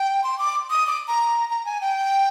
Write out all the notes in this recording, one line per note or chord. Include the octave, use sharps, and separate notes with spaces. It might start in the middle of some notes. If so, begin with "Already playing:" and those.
Already playing: G5
C6
D6
D#6
D6
A#5
A#5
G#5
G5